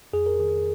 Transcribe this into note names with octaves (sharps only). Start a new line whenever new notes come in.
F2 G#4
A#4
D#3 G#4